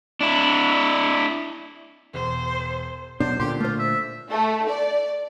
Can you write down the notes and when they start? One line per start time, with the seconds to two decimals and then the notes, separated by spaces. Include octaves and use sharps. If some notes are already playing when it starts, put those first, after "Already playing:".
0.21 D4 E4
2.14 E1 C5
3.20 B2 F#3 D4 C5
3.40 A#2 D3 G4 C6
3.60 A3 F4 C5
3.79 E5
4.31 A3
4.69 D5